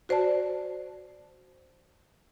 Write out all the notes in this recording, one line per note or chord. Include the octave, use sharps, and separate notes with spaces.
F#4 C5 D5 A5